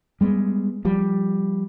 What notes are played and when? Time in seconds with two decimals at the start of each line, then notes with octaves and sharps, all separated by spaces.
0.21 G3 G#3 B3
0.85 F3 G3